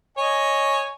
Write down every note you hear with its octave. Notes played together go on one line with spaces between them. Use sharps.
C#5 D#5 G#5